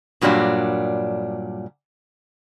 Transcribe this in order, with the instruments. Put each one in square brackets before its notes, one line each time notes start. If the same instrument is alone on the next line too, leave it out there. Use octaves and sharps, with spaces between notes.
[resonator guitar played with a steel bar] G2 A#2 F#3 G3 D4